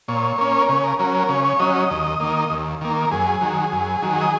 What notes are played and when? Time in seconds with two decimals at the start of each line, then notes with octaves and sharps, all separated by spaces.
0.08 A#2 C#5
0.38 A#3 C#4
0.61 A#4
0.69 C#3 C#5
0.84 A#4
0.99 F#3 C#4 A#4
1.14 A#4
1.29 C#3 C#5
1.44 C#5
1.59 F#3 C#4 D#5
1.75 D#5
1.90 D#2
2.20 D#3 A#3
2.50 D#2
2.81 D#3 A#3
3.05 A#4
3.11 F#2 G#4
3.41 D#3 F#3
3.72 F#2
4.02 D#3 F#3
4.21 D#5